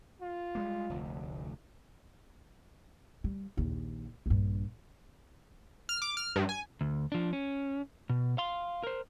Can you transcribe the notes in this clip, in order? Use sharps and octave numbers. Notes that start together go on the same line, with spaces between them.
F4
G3 G#3 A#3
F1 D2
G3
A#1 D#2
A#1 G2
F6
D6
F6
G2
G#5
D2
F3 D4
C#4
B2
F5 C6
A#4 C5